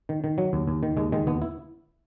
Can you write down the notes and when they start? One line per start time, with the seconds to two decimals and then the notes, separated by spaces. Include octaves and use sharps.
0.09 D#3
0.24 D#3
0.38 F#3
0.53 D#2
0.67 D#2
0.83 D#3
0.97 D#2 G#3
1.12 D#3 G#3
1.27 D#2 B3
1.42 E4